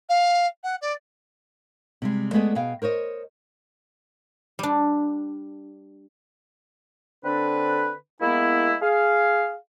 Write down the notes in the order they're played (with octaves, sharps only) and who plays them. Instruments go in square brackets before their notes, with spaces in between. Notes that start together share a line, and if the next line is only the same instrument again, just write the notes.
[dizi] F5
F#5
D5
[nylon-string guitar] C3 G3 G#3
G#3 A3 B3 G#4 B4 D5
B2 G#4 F5 G5
A#4 C5 C#5 D#5
[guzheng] G3 D4
[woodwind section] D3 C4 D4 A4 B4
G#3 A#3 B3 E4
G#4 F5